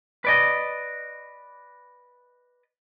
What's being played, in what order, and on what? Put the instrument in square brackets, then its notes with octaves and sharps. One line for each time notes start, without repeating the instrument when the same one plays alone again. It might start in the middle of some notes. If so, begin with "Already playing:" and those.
[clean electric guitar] B4 D5 D#5